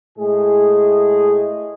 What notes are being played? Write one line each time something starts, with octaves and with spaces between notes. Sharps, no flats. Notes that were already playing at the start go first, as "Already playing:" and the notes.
A2 G#3 G#4